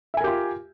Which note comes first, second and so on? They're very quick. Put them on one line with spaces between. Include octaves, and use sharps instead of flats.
E5 G#5 A#4 G4 F4